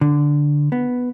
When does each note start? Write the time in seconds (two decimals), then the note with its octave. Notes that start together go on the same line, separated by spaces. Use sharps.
0.01 D3
0.72 B3